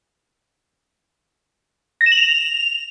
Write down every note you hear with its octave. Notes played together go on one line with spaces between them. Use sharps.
A#6
E7
F#7
F7